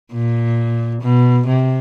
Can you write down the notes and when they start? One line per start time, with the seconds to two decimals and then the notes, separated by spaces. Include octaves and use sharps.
0.12 A#2
1.01 B2
1.47 C3